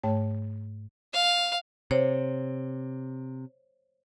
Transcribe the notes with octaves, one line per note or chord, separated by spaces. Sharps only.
G#2 A3 C#5 G5 A5
F5
C3 C5 C#5